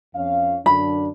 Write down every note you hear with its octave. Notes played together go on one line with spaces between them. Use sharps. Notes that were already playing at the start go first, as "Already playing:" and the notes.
F2 C#4 F5
F#2 D3 D4 B5